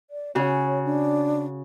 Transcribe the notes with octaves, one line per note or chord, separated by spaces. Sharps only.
D5
C#3 F#4 C#5
D4